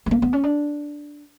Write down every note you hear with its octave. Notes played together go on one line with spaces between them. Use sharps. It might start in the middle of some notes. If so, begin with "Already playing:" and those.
A3
A#3
B3
C#4
D4